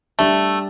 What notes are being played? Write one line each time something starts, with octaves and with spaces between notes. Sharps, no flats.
G3 A3 D4 G4